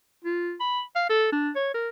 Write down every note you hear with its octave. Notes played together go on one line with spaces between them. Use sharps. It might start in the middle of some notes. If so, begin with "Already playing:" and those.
F4
B5
F5
A4
D4
C#5
A#4